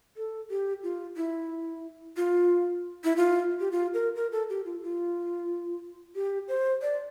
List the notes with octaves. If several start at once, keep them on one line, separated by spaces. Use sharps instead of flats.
A4
G4
F4
E4
F4
E4
F4
G4
F4
A#4
A#4
A4
G4
F4
F4
G4
C5
D5